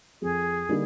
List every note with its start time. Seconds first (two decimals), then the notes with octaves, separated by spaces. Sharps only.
0.22 F2 G#4
0.69 D3 G3 A#3 D#4